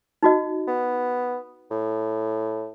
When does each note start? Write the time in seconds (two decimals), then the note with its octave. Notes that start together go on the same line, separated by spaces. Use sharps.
0.23 D#4 F#4 D#5
0.68 B3
1.71 A2